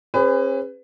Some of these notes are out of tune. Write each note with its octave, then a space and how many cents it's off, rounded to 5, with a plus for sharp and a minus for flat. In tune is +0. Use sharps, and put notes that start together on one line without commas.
C#4 -45 G#4 -30 B4 +25